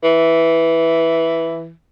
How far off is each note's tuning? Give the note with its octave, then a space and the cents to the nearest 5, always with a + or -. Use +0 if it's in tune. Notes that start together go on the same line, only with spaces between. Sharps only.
E3 +0